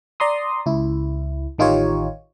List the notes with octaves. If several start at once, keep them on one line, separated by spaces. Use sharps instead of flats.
D5 A#5 C6 D#6
C#2 E4
A1 D#3 D#4 F4 G4 C#5